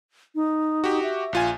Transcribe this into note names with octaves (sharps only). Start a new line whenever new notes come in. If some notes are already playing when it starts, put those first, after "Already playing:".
D#4
F#4 G4
E5
A#1 F4 G#5